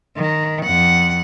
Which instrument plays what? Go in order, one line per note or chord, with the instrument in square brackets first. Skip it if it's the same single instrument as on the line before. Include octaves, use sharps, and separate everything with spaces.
[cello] D#3
F2 F#5